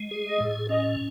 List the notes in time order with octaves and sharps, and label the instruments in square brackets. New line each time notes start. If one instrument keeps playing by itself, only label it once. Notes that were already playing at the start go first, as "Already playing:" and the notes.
Already playing: [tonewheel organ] G#3
G#4
[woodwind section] D#5
[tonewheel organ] A2
[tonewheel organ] C#4 [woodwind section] D#5